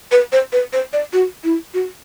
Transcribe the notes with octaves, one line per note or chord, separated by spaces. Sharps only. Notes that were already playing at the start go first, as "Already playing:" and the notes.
B4
C5
B4
C5
D5
F#4
E4
F#4